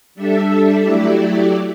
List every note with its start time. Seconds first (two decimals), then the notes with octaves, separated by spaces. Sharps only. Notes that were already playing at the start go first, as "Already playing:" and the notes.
0.15 G3 D4 A4 E5
0.84 F#3 A3 E4 G4 D5